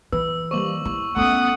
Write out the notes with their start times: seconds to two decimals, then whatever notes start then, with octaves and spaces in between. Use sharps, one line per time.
0.12 E3 B4 E6
0.51 G3 A#3 C5 C#6 D6 F#7
0.85 E4
1.16 A3 B3 C#4 F#5 D#6